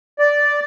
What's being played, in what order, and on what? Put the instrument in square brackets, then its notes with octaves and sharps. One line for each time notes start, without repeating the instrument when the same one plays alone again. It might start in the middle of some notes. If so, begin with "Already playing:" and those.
[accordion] D5